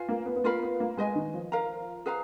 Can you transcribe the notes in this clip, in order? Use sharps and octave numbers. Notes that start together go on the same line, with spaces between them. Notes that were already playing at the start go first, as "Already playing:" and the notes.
Already playing: F4 B4 F5 G#5
A#3
B3
B3
A#3 F4 A#4 F5 B5
B3
A#3
G#3 B4 D#5 G#5
D#3
F3
A#4 F5 A#5
G#4 B4 F5 A#5